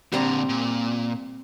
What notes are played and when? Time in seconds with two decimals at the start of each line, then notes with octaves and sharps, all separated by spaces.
0.13 A#2 D3 G3 C4 A#5
0.49 A#2